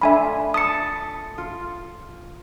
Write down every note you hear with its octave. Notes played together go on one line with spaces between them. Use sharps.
A3 D4 F4 E5 G#5 B5
A5 D#6 B6 C#7
F4